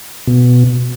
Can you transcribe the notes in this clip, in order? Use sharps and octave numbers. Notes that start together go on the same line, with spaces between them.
B2